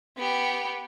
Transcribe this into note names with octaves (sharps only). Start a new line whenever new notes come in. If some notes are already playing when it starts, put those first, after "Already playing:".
B3 G4